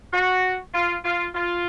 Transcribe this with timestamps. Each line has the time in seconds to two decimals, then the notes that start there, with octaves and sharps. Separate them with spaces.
0.13 F#4
0.74 F4
1.04 F4
1.35 F4